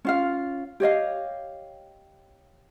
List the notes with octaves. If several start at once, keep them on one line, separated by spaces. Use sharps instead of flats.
C#4 F4 F5
G4 C#5 D#5 F5